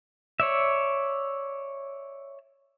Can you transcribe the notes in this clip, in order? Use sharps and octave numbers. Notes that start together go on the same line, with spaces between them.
C#5 D5 E5